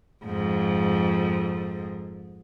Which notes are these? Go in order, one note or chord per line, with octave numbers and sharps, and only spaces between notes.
F2 G#2